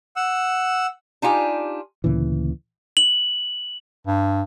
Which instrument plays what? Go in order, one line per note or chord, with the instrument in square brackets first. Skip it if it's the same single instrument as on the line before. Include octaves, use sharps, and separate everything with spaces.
[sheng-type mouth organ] F#5 E6
[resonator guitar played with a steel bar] D4 D#4 F4 G4 G#5
[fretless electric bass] D2 A#2 C#3 E3
[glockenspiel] F#7
[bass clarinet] G2